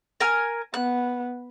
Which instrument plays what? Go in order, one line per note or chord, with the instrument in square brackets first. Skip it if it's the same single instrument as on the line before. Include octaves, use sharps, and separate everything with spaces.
[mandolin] A#4 G#5 F6
[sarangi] B3 [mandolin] F#6